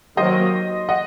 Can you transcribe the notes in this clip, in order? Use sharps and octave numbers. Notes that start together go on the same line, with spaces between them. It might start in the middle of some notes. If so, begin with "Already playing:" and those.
D#3 F#3 A#3 C5 D#5
D#5 F#5